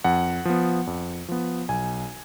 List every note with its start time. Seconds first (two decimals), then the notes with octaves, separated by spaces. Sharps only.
0.04 F2 F#5
0.45 F3 B3
0.87 F2
1.28 F3 B3
1.69 B1 G#5